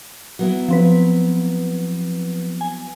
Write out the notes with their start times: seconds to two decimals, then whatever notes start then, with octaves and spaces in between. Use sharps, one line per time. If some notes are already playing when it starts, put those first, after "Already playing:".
0.39 F#3 B3 E4
0.68 F3 C4 B4
2.61 G#5